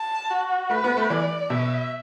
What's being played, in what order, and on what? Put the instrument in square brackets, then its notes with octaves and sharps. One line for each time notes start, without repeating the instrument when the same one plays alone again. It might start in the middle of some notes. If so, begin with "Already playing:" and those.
Already playing: [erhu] A5
F#4
[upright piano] A3 [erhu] B4
[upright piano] B3
A3
[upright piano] E3 [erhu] D5
[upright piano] B2 [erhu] E5